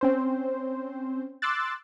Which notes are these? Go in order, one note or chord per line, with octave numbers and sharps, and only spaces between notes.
C4 C#4 C5
C6 D6 E6 F#6 A6